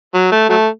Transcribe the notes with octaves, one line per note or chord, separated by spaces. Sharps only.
F#3
A3
F#3 A3